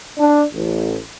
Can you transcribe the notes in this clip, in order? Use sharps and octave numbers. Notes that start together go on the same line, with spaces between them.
D4
A1